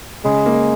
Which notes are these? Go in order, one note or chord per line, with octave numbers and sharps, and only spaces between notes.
C#3 G#3
A#3